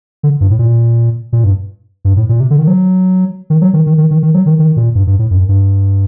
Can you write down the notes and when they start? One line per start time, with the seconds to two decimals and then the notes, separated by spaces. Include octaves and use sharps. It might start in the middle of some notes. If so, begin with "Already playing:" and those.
0.23 D3
0.41 G2
0.50 A2
0.59 A#2
1.33 A#2
1.44 G2
2.05 G2
2.16 A2
2.29 A#2
2.40 C3
2.51 D3
2.59 D#3
2.67 F#3
3.50 D#3
3.61 F#3
3.73 D#3
3.86 D#3
3.98 D#3
4.11 D#3
4.23 D#3
4.34 F#3
4.46 D#3
4.59 D#3
4.76 A#2
4.95 G2
5.07 G2
5.19 A2
5.31 F#2
5.49 G2